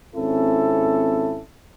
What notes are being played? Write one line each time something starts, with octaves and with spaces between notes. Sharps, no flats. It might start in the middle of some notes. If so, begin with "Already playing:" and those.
G#1 C4 C#4 E4 A4